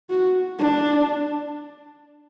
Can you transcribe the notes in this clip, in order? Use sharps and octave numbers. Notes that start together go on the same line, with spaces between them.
F#4
D4